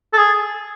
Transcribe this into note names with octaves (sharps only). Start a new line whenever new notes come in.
A4
G#4